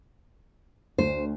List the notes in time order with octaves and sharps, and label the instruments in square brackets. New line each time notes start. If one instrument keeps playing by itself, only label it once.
[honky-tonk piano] D2 [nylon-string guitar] C5